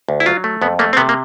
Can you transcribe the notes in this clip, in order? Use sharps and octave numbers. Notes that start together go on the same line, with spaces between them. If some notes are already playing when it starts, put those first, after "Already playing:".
D2
E4
F#3 F4
A3
F2 B3
A3 A#3
C4
C3 B3
A#3